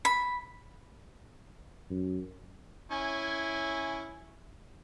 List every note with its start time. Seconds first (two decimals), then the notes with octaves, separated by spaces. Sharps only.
0.05 B5
1.90 F#2
2.92 C#4 E4 G#5